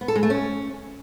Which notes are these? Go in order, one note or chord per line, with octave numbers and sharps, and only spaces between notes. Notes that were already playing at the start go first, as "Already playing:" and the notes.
B3
A4
G#3
A3
C#4